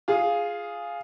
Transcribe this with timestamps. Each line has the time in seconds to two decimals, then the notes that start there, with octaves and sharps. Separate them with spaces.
0.08 F4 G#4